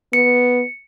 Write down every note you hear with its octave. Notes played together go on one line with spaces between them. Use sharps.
B3 C#7